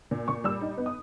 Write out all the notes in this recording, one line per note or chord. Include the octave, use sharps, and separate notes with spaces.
A#2
A#2 C#6
G3 E6
D#4
B3
D#6